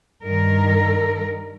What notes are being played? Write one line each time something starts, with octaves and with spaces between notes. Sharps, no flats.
G2 D#3 A#4